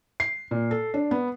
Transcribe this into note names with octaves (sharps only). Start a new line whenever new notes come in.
C7
A#2
A4
D4
B3